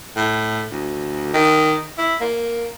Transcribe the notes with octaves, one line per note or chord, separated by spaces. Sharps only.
A2
D2
D#3
E4
A#3